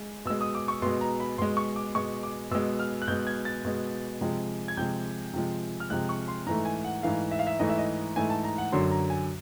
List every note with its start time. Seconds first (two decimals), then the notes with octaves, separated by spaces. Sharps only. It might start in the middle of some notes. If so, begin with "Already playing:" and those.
Already playing: G#3
0.25 B2 G#3 E6
0.41 D#6
0.55 D6
0.68 C#6
0.82 B2 G#3 C6
1.01 A#5
1.20 B5
1.38 B2 G#3 C6
1.57 C#6
1.76 D6
1.95 B2 G#3 C#6
2.23 D6
2.51 B2 G#3 E6
2.80 F6
3.02 F#6
3.08 B2 G#3 G6
3.27 G#6
3.45 A6
3.65 B2 G#3
4.21 C3 F3 G#3
4.68 G#6
4.77 C3 F3 G#3 G6
5.33 C3 F3 G#3
5.80 F6
5.90 C3 F3 G#3 F#6
6.09 C#6
6.28 C6
6.46 G#2 E3 A3 A#5
6.65 G#5
6.84 F#5
7.03 G#2 E3 A3 F5
7.31 E5
7.39 F5
7.47 E5
7.59 G#2 E3 A3 D#5
7.69 E5
7.78 D#5
8.16 G#2 E3 A3 G#5
8.30 A5
8.44 A#5
8.58 F#5
8.72 F#2 D3 F#3 C6
8.91 A#5
9.10 G#5